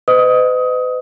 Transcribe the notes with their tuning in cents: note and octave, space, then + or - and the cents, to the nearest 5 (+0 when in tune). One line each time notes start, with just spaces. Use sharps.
B4 +45 D#5 -15 D#6 +20